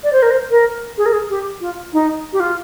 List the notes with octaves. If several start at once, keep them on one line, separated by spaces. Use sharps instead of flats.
D5
C5
A#4
C5
A#4
G#4
A#4
G#4
G4
F4
D#4
G4
F4